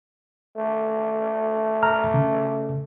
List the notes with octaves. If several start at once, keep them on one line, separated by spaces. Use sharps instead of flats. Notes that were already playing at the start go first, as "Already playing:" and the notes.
A3
A#5 F6
C#3